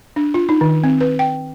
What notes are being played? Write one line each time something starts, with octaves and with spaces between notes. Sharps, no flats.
D4
F4
D#4
D#3
C4
B4
G5